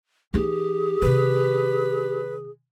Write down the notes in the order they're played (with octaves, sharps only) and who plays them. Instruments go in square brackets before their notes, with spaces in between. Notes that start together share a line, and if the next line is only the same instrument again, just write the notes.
[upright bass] E3 D#4 [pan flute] G4 [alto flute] G#4
[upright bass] C3 D#3 [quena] B4